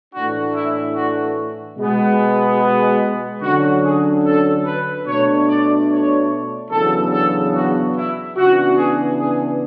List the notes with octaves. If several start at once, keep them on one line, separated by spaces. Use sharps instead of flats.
A2 E3 A3 D4 F#4
E4
F#4
B2 G#3 B3
D3 F#3 C#4 F#4
G#4
A4
B4
B2 A3 D4 C#5
D5
C#5
E2 C#3 F#3 B3 D4 A4
A4
F#4
E4
C#3 E3 B3 D4 F#4
G#4
G#4